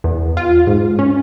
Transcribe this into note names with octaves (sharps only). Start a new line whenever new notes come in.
E2
F4
G#2
C#4